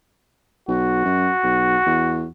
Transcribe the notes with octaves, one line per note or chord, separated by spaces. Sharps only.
B1 F#4
F#2
B1
E2